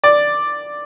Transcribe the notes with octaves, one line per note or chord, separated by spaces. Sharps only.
D5